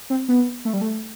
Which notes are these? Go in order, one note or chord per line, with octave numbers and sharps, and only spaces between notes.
C4
B3
A3
G3
A3